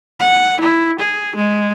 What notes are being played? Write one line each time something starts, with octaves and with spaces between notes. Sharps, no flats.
F#5
E4
G#4
G#3